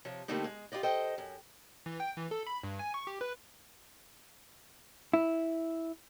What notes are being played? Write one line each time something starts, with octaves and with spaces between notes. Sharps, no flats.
C3 F3 C#5
D3 G3 A3 A#3 C4 D#4
G#3
F4 G4 D5 D#5
A4 C5 D#5 G5
F#2
E3
G5
E3
A4
B5
G2
G#5
C#6
G4
B4
E4